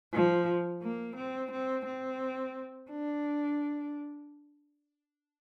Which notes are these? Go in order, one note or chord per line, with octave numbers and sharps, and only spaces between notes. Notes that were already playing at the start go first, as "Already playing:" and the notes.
F3
A#3
C4
C4
C4
D4